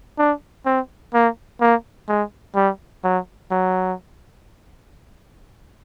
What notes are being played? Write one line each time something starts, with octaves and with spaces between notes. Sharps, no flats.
D4
C4
A#3
A#3
G#3
G3
F#3
F#3